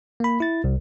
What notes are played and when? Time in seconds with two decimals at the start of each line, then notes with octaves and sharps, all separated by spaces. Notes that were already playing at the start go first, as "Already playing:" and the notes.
0.20 A#3 B5
0.40 E4 A6
0.64 C2